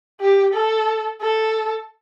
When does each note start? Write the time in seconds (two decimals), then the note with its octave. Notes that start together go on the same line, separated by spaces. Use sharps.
0.21 G4
0.54 A4
1.21 A4